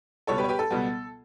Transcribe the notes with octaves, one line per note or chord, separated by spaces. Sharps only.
C#2 B2 G3 B3 A4 C#5
G4 B4
C#5
G4 B4
A4
C#2 B2 G3 B3